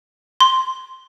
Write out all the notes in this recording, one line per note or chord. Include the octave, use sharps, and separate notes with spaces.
C6